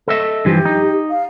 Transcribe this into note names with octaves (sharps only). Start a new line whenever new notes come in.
A4 D#5 E5
G2 E3 F3 G4
D#4
F5